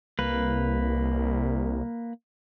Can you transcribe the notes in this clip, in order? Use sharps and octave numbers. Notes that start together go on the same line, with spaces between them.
C2 A#3 B4